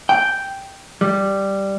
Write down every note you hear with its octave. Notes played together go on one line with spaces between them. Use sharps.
G5
G3